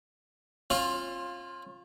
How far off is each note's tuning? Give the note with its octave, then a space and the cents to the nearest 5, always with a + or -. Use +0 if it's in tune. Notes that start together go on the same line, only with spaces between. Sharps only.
C#4 -40 F4 +10